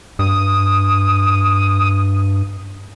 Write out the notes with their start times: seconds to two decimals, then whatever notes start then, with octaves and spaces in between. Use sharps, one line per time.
0.19 G2 D#6